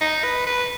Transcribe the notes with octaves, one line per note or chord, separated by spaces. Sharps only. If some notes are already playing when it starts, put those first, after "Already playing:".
D#4
B4
B4